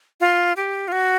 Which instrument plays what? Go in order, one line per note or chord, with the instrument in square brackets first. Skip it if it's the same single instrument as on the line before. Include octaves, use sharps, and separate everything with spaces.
[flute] F4
G4
F4
F#4